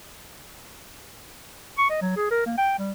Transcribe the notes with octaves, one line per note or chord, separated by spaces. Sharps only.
C#6
D#5
F#3
G#4
A#4
A#3
G5
G3